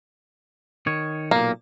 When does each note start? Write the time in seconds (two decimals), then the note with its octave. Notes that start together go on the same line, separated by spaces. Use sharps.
0.87 D#3 C#5
1.31 B1 A#2 A#3